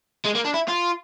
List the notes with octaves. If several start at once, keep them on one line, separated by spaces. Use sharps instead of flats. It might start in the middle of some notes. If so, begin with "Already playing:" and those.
G#3
A#3
D4
E4
F4